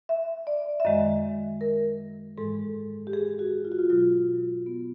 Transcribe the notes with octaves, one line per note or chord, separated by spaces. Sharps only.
E5
D5
E5
F#2 D#3 G#3 D#5
A#4
G#2 E3 G#3 A4
G4
G#4
F#4
F4
F#4
F4
B2 F#3 F4
B3